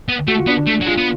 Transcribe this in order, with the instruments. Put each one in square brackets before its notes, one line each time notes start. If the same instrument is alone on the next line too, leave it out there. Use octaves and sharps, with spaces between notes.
[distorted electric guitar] B3
[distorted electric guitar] A3 [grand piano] F#4
[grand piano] F4
[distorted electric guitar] B3 [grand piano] D4
[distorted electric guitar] A3
F#3
[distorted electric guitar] G#3 [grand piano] F4
[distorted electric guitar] B3